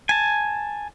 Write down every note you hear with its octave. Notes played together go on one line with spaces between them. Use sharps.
G#5 A5